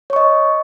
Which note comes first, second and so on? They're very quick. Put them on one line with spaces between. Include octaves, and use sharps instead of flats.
C#5 C#6 D#5